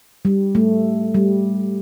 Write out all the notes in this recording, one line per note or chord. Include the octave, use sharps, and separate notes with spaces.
G3
A3
G3